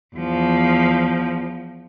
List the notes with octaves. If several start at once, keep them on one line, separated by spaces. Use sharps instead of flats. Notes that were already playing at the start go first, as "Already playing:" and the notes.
E2 F3